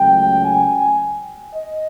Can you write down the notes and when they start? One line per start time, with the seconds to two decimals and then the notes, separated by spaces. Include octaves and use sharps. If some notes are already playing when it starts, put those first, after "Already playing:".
Already playing: C#2 C#3 F#3 A3 G5
0.44 G#5
1.54 D#5